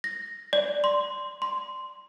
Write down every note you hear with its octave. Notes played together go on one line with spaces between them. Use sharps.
A#6
D5
C6
C6